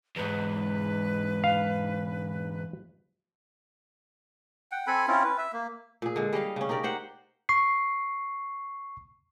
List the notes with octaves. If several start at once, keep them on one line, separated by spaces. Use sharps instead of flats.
E2 G#2 B4
F5
F#5 G5
C4 A4 G#5 B5
C4 C#4 E4 F4
B4
E5
A#3
A#2 G#4
D3 G#3
G3 G#4 D#5 F5
C#3 C#4
D#4 G4 A#4 D5
G4 C5 F#5
C#6 C7